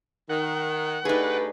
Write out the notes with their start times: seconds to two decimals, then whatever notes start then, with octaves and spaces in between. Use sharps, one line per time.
0.29 D#3 F#5
1.05 G2 A3 D#4 G#4 B4 D5